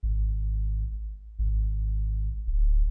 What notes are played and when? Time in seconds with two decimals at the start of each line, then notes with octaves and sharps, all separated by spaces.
0.03 G#1
1.39 G#1
2.47 D1